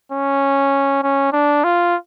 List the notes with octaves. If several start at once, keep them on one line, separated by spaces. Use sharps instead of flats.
C#4
C#4
D4
F4